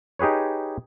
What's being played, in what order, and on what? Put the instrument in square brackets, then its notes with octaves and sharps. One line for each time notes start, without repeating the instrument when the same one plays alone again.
[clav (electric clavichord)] D#4 G4 G#4 B4 C#5